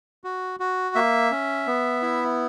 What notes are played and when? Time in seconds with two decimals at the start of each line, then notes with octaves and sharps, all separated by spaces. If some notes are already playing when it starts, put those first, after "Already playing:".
0.24 F#4
0.60 F#4
0.95 A#3 E5
1.31 C#4
1.67 B3
2.02 E4